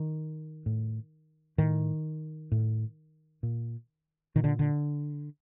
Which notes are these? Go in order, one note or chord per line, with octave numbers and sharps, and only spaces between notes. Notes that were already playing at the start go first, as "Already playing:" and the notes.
Already playing: D#3
A2
A2 D#3
A2
A#2
A#2 D#3
D3
D3